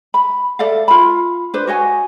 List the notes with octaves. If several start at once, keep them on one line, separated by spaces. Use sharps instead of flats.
B5
A4 D5 E5 F5
F4 B5
D4 B4 C5
F#4 C#5 D#5 G#5